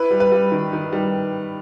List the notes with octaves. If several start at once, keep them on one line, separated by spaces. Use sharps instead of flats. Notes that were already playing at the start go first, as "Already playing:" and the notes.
Already playing: E4 B4
G3
B4
G3
D#3
D#3
G3